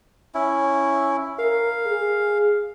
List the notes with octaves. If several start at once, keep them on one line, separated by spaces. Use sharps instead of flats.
C#4 E4
A#4 F5
G#4